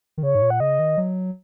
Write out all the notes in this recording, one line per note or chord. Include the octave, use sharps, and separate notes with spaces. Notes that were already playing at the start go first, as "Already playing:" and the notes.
D#3
C#3 C#5
G#2
A#2
F#5
C#3 D#5
D#3
F#3